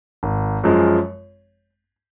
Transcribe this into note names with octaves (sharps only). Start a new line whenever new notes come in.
G#1
F#2 F3 G#3